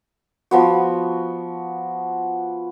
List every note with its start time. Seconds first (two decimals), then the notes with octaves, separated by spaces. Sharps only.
0.51 F3 B3 F#4